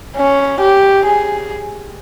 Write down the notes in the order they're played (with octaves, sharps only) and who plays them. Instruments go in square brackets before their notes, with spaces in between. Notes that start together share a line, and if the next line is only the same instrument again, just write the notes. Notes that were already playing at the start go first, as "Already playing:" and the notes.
[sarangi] C#4
G4
G#4